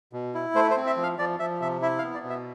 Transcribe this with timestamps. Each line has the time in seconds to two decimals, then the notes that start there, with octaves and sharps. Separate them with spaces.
0.13 B2
0.35 E4
0.55 A3 C5
0.71 C5
0.77 C4
0.87 E5
0.97 F3
1.03 F5
1.19 F3 D5
1.40 F3 E5
1.62 C3 E5
1.82 E4 E5
1.98 F5
2.04 B3
2.14 D5
2.24 B2
2.30 E5